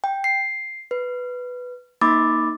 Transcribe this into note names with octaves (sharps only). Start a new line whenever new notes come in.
G5
C7
B4
A#3 D#4 B5 D6 A6